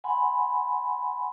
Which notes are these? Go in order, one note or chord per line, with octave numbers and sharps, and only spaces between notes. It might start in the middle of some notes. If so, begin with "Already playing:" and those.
F#5 G#5 B5 C6